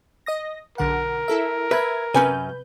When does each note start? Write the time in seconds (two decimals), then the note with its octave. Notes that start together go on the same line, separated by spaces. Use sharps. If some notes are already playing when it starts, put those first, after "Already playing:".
0.26 D#5 D#6 A#6
0.78 B1 D3 A#4 F#5
1.28 E4 A4 E5
1.71 B4 E5 G#6
2.14 F#2 C3 C#4 B4 G#5 G6